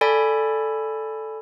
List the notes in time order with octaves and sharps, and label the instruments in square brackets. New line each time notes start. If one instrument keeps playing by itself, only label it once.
[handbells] A4 D5 G#5 B5